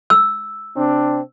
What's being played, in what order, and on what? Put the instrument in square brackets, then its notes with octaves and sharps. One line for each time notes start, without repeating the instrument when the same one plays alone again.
[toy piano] E6
[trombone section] C3 C4 D4